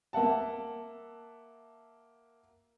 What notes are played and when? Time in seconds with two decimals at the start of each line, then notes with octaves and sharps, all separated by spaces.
0.13 A#3 E5 F#5 A5